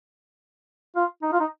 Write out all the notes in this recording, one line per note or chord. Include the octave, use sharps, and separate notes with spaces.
F4
D#4
F4
D#4